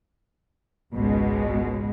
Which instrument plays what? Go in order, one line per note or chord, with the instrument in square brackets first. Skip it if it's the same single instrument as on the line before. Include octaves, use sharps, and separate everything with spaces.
[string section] G#1 C#2 [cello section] B2 G#3